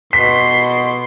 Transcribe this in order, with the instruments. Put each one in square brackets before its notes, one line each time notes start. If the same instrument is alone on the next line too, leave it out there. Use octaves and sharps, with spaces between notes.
[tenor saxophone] B2 [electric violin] C6 C7 [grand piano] B6